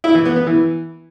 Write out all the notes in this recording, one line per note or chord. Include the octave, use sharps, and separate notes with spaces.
E4
E3
B3
B3
E3